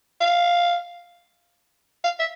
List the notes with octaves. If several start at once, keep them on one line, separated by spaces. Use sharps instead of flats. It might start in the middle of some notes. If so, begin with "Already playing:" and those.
F5
F5
E5